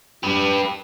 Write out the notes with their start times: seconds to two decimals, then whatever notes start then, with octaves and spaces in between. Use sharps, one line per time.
0.23 G4 B4